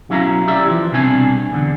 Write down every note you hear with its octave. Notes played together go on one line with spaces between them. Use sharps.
B1 F#3 C#4 E4 F5 A#5
G4 D5 E5
E3 F3
C2 B2 C4 D4 G#5
E2 D3